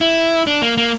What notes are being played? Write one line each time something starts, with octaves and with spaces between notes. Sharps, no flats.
E4
D4
A#3
A#3